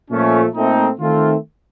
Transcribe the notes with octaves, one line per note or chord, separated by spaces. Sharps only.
A#2 F3 A3 C#4
A#2 A3 C4 D#4
D#3 A3 C4 F4